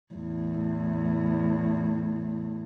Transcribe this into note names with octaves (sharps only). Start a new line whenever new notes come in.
E2 A2